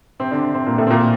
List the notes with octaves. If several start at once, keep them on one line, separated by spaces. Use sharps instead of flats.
C3 C4
D3 D4
C3 C4
A#2 A#3
A2 A3
C4
A#2 A#3